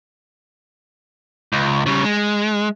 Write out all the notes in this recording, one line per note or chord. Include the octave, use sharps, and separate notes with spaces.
C#2
C#3 G3
G#3